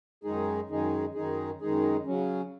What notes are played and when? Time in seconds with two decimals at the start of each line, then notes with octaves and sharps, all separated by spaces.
0.24 F#2 D#3 G#3 D#4 G#4
0.69 F#2 D#3 G#3 D#4 G#4
1.15 F#2 D#3 G#3 D#4 G#4
1.61 F#2 D#3 G#3 D#4 G#4
2.06 C#3 F#3 C#4